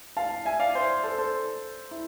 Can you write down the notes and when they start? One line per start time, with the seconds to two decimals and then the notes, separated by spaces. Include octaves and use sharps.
0.17 F5 A5
0.45 E5 G#5
0.59 D5 F5
0.75 C5 E5
1.04 A4 C5
1.18 A4 C5
1.91 E4